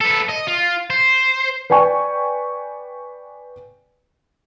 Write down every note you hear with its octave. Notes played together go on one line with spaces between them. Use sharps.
B3 A4
D#5
F4
C5
B4 D5 G5 G#5 C#6